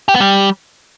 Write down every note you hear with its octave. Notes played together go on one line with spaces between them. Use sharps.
G4
B3
G3